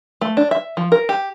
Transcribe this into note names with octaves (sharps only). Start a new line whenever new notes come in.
A3
D4
E5
F3
A#4
G4